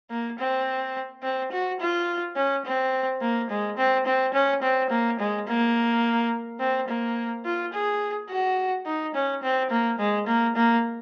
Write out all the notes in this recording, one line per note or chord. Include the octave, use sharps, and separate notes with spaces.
A#3
C4
C4
F#4
F4
C#4
C4
A#3
G#3
C4
C4
C#4
C4
A#3
G#3
A#3
C4
A#3
F4
G#4
F#4
D#4
C#4
C4
A#3
G#3
A#3
A#3